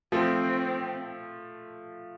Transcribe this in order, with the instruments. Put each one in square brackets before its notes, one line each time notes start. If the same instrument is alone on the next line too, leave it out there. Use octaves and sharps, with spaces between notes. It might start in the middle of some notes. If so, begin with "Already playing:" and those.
[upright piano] F3 A3 [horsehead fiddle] C4